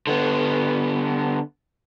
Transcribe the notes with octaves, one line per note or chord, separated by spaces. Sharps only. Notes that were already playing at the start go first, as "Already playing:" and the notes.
D3 B3